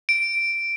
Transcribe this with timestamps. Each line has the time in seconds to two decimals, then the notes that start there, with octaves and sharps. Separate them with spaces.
0.09 D7